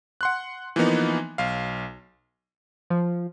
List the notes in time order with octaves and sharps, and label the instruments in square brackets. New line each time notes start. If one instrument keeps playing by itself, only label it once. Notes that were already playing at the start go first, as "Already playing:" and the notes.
[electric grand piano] F#5 C6 F#6
E3 F3 A#3 B3 D#4
B1 F5
[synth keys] F3